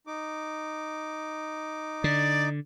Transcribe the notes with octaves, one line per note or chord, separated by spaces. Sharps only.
D#4 D6
D3 D5